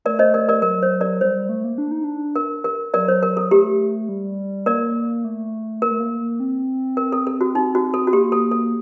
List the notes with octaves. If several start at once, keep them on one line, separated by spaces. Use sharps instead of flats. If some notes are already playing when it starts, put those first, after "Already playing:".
A3 A#4 D5
C5 D#5
A#4 D5
A#4 D5
F#3 A#4
C5
A#4 D5
G3 C5
G3
A3
A#3
D4
D#4
D4
A#4
A#4
F#3 A#4 D5
C5
A#4
A4
A3 G4
G3
A#3 A#4 D5
A3
A#3 A#4
A3
A#3
C4
A#4
A4
A4
F#4
D#4
F#4
A4
F#4
A#3 G4
A4
A4